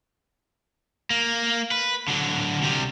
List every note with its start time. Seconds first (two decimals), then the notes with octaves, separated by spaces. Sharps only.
1.10 A#3
1.71 B4
2.08 D3 F#3
2.62 C3 G3